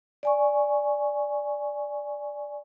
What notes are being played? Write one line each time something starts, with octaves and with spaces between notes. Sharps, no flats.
D5 G#5 C#6